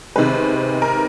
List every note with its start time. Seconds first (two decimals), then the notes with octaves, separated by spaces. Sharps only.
0.16 C3 D#3 G#3 C4 B4
0.82 A#4